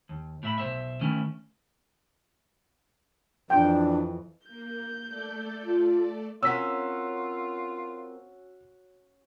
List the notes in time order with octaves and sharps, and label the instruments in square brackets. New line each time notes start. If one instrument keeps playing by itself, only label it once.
[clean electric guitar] D#2
A2 E5 B5
B1 C5 E5
D#3 A3 C#4 E4
[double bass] F2 E3 [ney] D4 [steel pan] G5
[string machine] A#3 [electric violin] G6
[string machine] A3 A4 D5
[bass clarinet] F4
[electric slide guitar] C4 A#4 [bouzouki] C#4 F#4 [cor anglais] F4 [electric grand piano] E6 B6